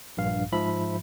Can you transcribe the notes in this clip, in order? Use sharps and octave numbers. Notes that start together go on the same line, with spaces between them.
A#1 G2 F5
G#2 F3 E5 B5